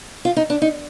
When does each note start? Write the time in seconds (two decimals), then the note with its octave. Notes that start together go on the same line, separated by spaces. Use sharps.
0.25 F4
0.37 D#4
0.50 D4
0.62 D#4